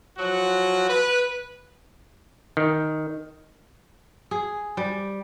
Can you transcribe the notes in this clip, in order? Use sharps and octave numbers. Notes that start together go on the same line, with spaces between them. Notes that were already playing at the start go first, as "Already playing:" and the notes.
F3 F#3 F#4
B4
D#3
G#4
G3